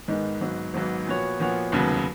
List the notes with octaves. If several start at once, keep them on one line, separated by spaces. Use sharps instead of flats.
G#2 D#3 G#3 B3
G#1 G#2 F#3 B3
G#1 G#2 F#3 B3
A#2 F3 B3 F#4 C#5
A#2 F3 B3 F#4 C#5
F1 D#2 C#3 F#3 B3